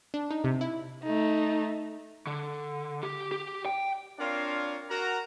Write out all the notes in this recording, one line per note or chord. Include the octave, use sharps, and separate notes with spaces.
D4
D#4
C3
E4
A3 D#4
D3
G4
G4
G5
C4 D4 F4 A#4 C#5 F5
F#4 A#4 A#5